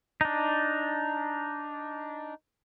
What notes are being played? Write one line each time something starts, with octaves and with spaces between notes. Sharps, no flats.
D4 D#4